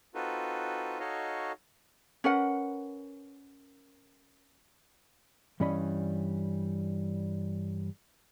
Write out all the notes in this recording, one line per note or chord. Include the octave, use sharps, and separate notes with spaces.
C4 D#4 F4 F#4 A4 B4
D#4 F#4 A4 C#5 D#5 F5
C#4 A#4 B4 F#5
G2 E3 G3 C#4 D#5 B5